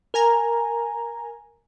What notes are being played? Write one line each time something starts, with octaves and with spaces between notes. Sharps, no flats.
A#4 G#5 A#5